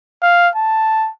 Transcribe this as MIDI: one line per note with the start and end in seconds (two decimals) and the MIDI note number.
0.22 0.49 77
0.56 1.09 81